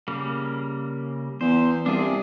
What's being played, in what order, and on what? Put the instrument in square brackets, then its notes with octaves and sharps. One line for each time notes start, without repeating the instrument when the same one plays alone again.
[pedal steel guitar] C#3 G3 A#3
[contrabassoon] E2 [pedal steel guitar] C5
[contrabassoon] C2 [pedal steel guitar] D4 F4 G#4